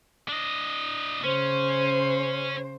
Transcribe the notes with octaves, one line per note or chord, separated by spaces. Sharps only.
D4 D#5
C#3 C#4 C5